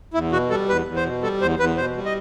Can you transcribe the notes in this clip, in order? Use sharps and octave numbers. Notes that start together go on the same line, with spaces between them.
E2 E4
B2 F#4
G3 A4
E2 B4
E2
C5
B2
G3 A4
E2 C5
E2 B4
B2 C5
G3
D#5